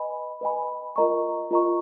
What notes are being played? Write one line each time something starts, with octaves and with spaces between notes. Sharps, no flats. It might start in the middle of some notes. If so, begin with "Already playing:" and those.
Already playing: B4 D#5 G#5 B5
B4 D#5 G#5 B5
F4 A#4 D#5 A#5 C#6
F4 A#4 D#5 A#5 C#6